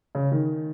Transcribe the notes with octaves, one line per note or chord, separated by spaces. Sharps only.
C#3
D#3